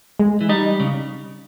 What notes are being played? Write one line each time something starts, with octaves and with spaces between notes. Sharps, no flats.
G#3
E3
G3 D#4
C#3